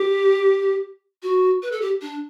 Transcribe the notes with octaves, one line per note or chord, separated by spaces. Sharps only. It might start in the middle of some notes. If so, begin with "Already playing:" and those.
Already playing: G4
F#4
B4
A4
G4
D4